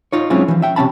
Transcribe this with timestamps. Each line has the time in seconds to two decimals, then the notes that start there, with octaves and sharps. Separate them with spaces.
0.13 D#4 F4 C#5
0.30 F#3 G#3 C4 C#4 E4 F4
0.48 E3 F3
0.62 E5 G5
0.76 C3 F#3 C#4 A5 B5